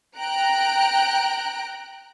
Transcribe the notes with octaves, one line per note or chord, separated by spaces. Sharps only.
G5 A#5 F#6 D7